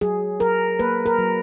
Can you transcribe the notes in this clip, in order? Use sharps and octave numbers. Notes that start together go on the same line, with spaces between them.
F#3 G#4
F#3 A#4
A#3 B4
A#4
F#3